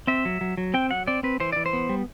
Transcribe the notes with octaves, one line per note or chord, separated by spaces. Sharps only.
C4 E5
F#3
F#3
F#3
C4 G5
F#3 F#5
C4 D5
C4 B4
E3 C5
E3 D5
C5
B3
G3